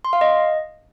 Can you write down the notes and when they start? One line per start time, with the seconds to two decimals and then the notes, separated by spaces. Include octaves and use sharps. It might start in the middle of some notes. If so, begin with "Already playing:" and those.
0.05 C6
0.13 F5
0.21 D#5